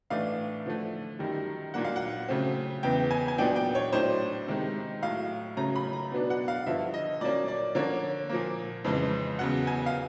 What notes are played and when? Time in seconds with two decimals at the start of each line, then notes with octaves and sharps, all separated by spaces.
0.10 A2 E3 A3 D4 F5
0.66 D3 F3 A3
1.19 F#2 D#3 G3
1.74 A#2 F#3 A#3 D4 F#5
1.85 F5
1.96 F#5
2.28 C#3 F#3 A3 C4
2.83 E2 C#3 E3 G5
3.11 G#5
3.28 G#5
3.38 A#2 F#3 B3 D4 G5
3.56 G5
3.75 C#5
3.93 A2 F#3 A3 D4 C5
4.48 C3 D#3 G#3
5.02 A2 F#3 A3 F5
5.57 C#3 F#3 A3 C#4 A#5
5.76 B5
5.93 A#5
6.12 B2 F#3 B3 D4
6.30 F#5
6.48 F5
6.66 G2 D3 F3 E5
6.94 D#5
7.21 A#2 F#3 A#3 C#4 D5
7.48 D5
7.75 D3 F3 A#3 C#4 C#5
8.29 A#2 F3 A#3
8.84 F2 C#3 E3 G#3
9.39 E2 C#3 F#3 F#5
9.67 G#5
9.86 F5